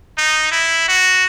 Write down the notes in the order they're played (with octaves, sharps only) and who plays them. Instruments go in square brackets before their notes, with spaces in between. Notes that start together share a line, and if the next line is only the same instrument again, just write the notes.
[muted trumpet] D#4
E4
F#4